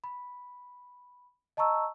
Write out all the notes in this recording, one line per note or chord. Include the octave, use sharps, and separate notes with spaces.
B5
D#5 A5 A#5 C#6 E6